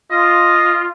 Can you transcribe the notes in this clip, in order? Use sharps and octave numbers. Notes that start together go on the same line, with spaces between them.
F4 D#5